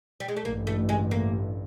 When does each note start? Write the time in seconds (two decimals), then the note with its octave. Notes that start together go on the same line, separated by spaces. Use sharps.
0.20 G3
0.28 G#3
0.37 A3
0.45 A1 G2 D3 A#3
0.67 A3
0.89 G#3
1.11 A#3